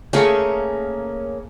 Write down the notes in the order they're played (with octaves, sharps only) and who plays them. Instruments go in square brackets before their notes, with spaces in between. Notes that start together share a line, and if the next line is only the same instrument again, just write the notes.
[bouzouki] C#3 A#3 C#4 [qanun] A3 G#4 C#6